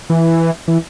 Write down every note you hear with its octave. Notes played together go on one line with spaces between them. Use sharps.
E3
E3